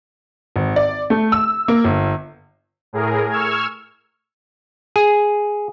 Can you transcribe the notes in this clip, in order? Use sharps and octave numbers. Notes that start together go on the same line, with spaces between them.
G#1
D5
A3
E6
A#3
G1
A2 G#4 A#4
C#6 E6 F6 G#6
G#4